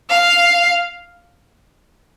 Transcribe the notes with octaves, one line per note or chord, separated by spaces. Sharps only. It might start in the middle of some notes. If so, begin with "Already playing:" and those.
F5